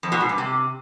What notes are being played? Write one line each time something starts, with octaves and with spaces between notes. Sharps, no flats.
F2
B2
G#2
G2
C3